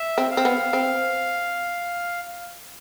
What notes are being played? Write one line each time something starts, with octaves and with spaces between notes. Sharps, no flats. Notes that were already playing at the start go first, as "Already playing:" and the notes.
Already playing: E5
C4
F5
C4
B3
C4